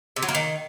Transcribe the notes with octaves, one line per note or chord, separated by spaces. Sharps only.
C3
F#3
A#3
D#3